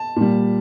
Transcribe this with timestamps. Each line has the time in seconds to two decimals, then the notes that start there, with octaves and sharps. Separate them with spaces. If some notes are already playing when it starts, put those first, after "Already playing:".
Already playing: A5
0.16 A#2 G3